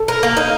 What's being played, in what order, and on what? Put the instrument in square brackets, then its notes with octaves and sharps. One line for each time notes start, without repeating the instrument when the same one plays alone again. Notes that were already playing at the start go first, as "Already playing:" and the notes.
Already playing: [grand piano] A4
[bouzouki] A#4
A#3
D#4